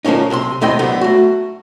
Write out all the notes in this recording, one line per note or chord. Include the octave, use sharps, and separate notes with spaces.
D3 F3 A#3 C#4 D#4
B1 C3 B5 C6
D#2 C3 E4 D#5 G5 C6
D3 F#3 B3
A3 F#4